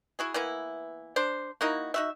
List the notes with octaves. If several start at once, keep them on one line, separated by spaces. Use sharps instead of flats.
E4 F#4 G#4
E3 A#3 B3 E4
D4 C5
A#3 D#4 E4 F#4
D#4 F#4 E5